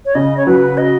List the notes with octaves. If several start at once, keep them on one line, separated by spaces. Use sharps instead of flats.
C#5
C#3 D#5
C#5
F#3 B4
D#5